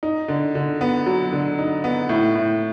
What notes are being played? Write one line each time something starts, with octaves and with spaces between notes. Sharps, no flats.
D#4
D3
D3
B3
F#3
D3
D#4
B3
A2
A2